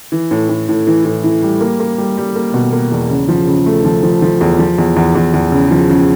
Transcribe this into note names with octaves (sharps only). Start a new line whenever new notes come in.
E3
A2
A2
A2
E3
A2
E3
G3
A#3
A#3
G3
G3
A#3
B2
A#3
E2
C#3
F3
C#3
A3
F3
F3
F3
E2
F3
E2
E2
E2
E2
C#3
F3
C#3